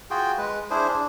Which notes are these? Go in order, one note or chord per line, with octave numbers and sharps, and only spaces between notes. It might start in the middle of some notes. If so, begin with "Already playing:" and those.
F4 F#4 G#4 G5
G#3 B4
D4 E4 G#4 C5
D4